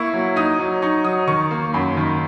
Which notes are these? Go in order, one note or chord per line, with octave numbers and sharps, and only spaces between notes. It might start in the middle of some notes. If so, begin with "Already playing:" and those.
Already playing: A#3 E4 C#6
F#3
D#4 D#6
F#3
D#4 C#6
F#3 D#6
D#3 C#6
A#3
F#2 B5
D#3